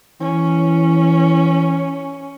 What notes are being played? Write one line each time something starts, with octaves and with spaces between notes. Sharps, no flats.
E3 C#4